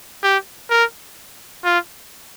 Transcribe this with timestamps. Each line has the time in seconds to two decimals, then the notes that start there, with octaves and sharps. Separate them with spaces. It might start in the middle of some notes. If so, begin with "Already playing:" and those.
0.23 G4
0.70 A#4
1.64 F4